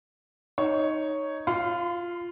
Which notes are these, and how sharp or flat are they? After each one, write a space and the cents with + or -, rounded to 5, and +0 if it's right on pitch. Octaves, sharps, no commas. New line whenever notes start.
D#4 +0 C#5 +0
F4 -5 C6 -45